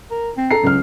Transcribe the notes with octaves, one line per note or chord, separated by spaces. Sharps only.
A#4
C4
A4 A#5 C7
C#2 F#3 F6